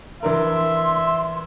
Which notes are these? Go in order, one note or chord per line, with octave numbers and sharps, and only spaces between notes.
E3 D4 A#4 E5 C6